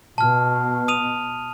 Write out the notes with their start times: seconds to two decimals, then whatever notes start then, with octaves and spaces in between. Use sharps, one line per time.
0.18 B2 A5 F6
0.88 D#6 D#7 F7